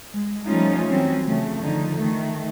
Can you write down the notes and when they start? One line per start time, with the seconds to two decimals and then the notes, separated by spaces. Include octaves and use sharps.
0.13 G#3
0.46 F3 G3 A3 C#4 D#4 F4
0.88 E3 F#3 G3 C4 C#4
1.26 C#3 F3 A3
1.60 D3 D#3 F3 D#4
1.97 D#3 A3